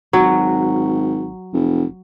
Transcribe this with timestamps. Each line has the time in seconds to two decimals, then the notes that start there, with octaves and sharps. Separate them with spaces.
0.13 G#1 F#3
1.53 F1